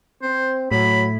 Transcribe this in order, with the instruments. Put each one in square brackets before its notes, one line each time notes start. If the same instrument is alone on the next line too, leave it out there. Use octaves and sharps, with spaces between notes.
[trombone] C4 [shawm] C5
[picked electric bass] A2 [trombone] F#3 [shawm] B5